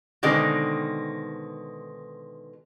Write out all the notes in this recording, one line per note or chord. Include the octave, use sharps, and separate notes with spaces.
B2 D3 D#3 G#3 C4